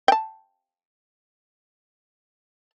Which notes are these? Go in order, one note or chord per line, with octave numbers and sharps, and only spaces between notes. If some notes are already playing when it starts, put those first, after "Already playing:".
G5 A5